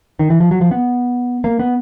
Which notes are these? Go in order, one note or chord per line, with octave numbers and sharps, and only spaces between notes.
D#3
E3
F3
F#3
F3
B3
A#3
B3